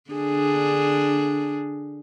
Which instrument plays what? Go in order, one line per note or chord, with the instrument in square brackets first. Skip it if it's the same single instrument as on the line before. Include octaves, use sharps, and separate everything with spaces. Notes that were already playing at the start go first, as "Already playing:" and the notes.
[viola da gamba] D3 D4 G#4